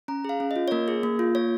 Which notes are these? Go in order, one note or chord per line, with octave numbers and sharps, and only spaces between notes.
C#4 A#5
G#4 F5
C#4
F4 D#5
C#5
A#3 A#4
G#4
A#3
F4
A#3 C#5